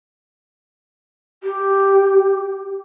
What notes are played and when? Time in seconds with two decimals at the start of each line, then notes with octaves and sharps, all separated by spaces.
1.44 G4